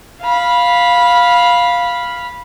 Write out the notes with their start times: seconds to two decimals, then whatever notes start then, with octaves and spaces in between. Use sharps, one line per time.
0.22 F5 B5